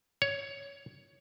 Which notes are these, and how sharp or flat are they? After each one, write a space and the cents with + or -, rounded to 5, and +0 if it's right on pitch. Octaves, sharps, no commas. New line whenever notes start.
C#5 +10